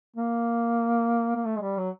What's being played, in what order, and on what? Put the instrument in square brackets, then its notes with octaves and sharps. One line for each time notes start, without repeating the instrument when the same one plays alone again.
[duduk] A#3
A#3
A3
G#3
G3
F#3